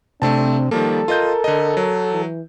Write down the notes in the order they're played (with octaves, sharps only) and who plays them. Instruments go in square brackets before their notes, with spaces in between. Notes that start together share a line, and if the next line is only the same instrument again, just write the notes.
[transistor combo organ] C3 [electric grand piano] A3 C4 A5 [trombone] D4
[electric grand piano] D#3 F3 A#3 [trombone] G3 [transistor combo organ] A4
[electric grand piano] F4 D#5 G6 [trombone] A#4
[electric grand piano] D3 D#5
F#3
[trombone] E3